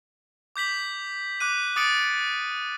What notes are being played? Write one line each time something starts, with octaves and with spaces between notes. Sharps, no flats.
D6 G6 B6 F#7
D6 F#6 D#7
D6 D#6 A6 C#7 D7 F#7